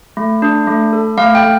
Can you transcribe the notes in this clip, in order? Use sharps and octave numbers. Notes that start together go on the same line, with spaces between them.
A3
D4
A3
A4
A3 F5
G5
A3